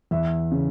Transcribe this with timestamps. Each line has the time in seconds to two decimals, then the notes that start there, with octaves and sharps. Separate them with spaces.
0.11 E2 E5
0.51 C#3